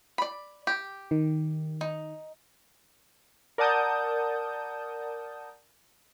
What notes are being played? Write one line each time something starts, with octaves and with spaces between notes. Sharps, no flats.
D5 B5
G4
D#3
D#4
A#4 D5 F#5 A5 D#6 G6